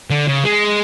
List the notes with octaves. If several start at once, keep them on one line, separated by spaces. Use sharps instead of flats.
D3
C#3
G#3